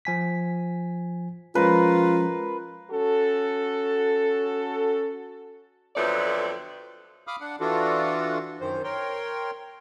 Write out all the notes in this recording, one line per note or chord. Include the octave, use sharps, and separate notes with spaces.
F3 G#5 B6
F3 G#3 C#4 F4 A#4 B4
C#4 F#4 A4
F2 D3 F#3 A3 B3 D5
F5 B5 D6 D#6 F6
D4 F#5
E3 D4 F4 F#4 A4
F#2 D#3 C5
A#4 C#5 G5 C6